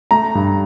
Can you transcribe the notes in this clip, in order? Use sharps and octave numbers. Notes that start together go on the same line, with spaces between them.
A3 A#5
G2